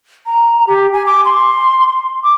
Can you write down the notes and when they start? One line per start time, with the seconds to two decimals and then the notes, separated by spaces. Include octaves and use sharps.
0.26 A#5
0.67 G4
0.93 G#5
1.06 D6
1.25 C6
2.24 D6